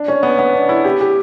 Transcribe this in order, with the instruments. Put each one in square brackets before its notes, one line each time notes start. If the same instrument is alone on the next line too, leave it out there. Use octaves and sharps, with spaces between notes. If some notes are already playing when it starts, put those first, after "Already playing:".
Already playing: [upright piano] D4
C#4
B3
B3
D4
E4
G4
G4